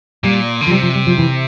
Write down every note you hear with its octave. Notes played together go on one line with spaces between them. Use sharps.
A#2 G3
D3
F3
C3 G3
F3
G3
F3
E3